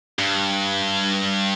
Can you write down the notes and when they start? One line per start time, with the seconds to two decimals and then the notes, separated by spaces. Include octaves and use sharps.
0.19 G2